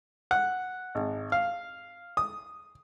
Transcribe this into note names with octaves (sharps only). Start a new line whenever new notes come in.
F#5
G#1
F5
D#6